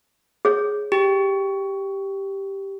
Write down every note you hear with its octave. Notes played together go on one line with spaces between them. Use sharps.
G#4 C#5
G4